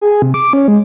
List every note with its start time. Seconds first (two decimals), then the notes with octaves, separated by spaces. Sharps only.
0.01 G#4
0.22 C3
0.34 D6
0.53 C#4
0.68 G#3